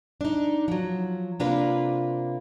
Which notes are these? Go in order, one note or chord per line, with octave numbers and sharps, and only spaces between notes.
D4 D#4
F3 F#3
C3 A#3 D4 F4 B4